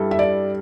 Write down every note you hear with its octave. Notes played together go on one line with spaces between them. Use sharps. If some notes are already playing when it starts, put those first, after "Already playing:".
Already playing: G2 G3 E4 A4
E5
D5